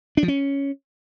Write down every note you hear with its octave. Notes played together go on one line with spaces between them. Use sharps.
D4
F3
C#4